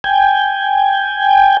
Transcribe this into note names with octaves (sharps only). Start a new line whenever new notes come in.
G5 G#5